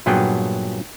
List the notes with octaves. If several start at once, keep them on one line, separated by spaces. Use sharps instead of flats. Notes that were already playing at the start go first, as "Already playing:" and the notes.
G2 A#2 F#3 B3 G#4 G5